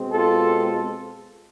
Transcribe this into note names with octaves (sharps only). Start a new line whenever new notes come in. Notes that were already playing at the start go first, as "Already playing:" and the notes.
Already playing: B2 G#3 C4
F4 A4